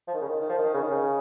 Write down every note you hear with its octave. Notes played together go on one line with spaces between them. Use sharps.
F3
D#3
C#3
D#3
D#3
F3
D#3
C#3
D#3
C#3